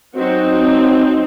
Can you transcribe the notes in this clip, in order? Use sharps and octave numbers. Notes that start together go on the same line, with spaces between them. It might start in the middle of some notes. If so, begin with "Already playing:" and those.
F#3 C4 D#4 F#4